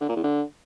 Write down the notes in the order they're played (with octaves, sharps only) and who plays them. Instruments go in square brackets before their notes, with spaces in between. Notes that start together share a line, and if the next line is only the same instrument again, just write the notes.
[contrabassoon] D3
A#2
E2
D3